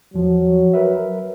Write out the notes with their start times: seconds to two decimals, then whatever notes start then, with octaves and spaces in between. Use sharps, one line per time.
0.14 E2 F3 F#3
0.74 A#4 B4 E5